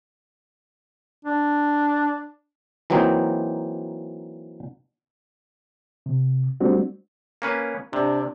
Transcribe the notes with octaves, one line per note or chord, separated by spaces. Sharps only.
D4
E3 F#3 A#3 C4 D#4
C3
G3 A3 C4 D4 F#4
A#3 C#4 B4
C3 D4